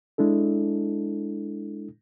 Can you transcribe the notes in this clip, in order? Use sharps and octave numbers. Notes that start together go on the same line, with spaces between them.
G#3 D4 E4 A4